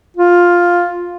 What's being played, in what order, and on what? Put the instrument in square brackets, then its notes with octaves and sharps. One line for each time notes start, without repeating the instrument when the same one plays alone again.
[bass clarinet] F4